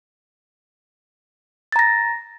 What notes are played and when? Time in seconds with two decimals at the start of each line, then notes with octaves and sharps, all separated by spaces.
1.72 A6
1.76 A#5
1.79 A#6